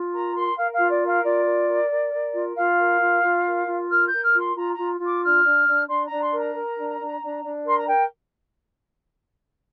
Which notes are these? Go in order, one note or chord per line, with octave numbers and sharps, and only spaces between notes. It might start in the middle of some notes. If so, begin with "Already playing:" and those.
Already playing: F4
A#4 A#5
A#4 C6
A#4 F5
F5
F4
D5
A#4
F5
F4 D5
A#4
A#4
A#4
A#4
F4
F4 F5
A#4
F4
F4
A#4
F4
A#4 F6
G6
A#4
F6
F4
C6
F4 A#5
F4 A#5
F4
D6
D4 F6
D4
D4
D4 C6
A#5
D4
C6
A#4
A#5
A#4
D4
D4
D4
D4
A#4 C6
A#5
A#4 G5